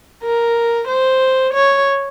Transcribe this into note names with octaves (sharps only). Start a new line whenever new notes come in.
A#4
C5
C#5